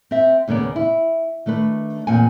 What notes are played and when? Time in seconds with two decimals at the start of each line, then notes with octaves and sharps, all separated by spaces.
0.11 C4 E5
0.48 D#2 C#3 A#3 B3 D5
0.76 E4
1.46 D#3 A3 D4 B4
2.07 E2 A#2 C4 F#5 G#5